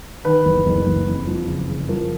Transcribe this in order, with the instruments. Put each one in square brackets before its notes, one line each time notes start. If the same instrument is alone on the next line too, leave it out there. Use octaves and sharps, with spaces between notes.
[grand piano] D#3 B4
F#1
F#1
F#1
F2
F3
C#3
C#3
F3 A#4